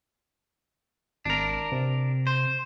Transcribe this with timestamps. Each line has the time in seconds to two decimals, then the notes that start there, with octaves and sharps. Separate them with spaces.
1.25 G#1 D4 A#4
1.72 C3
2.27 C5